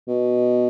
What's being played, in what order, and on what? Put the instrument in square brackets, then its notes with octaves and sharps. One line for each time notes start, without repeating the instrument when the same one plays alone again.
[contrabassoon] B2